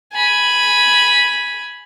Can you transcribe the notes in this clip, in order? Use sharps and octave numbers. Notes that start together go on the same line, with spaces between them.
G#5 B5